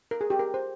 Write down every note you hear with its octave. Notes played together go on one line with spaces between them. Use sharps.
A#4
G#4
G4
A#4
C5